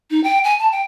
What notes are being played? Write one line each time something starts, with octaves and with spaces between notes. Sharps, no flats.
D#4
G5
G#5
A5
G5